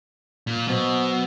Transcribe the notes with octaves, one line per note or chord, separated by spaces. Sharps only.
A#2
B2 F#3 C5 E6